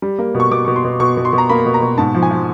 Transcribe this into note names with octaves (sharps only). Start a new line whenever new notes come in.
G3
A#3
B2
C#6
B2 D6
B2 C#6
C6
B2
B2 C#6
B2
C6
B2
A#5
A#3 B5
B2
A#5
B2
G#2 A5
F3
G#5
F3